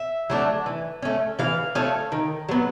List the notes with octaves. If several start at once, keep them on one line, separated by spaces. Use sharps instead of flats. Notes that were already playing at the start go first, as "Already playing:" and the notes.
Already playing: E5
F#3 A3 D4
E3
A3 C#4
E3 F5
A3 C#4
D#3
F#3 B3